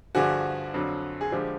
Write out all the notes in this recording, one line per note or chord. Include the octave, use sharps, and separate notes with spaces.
G2 D3 F3 F#4 G#4
F2 D3 F#3
G#4
D3 F3 G#3 G4